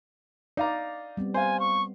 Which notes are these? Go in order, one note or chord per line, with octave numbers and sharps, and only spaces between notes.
D#4 D5 F5 A#5
G3 B3 C4
C5 F5 G#5
C#6